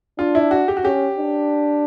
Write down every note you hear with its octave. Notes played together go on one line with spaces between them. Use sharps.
D4 F4
E4
F#4
G4
F#4
C#4 G4
D4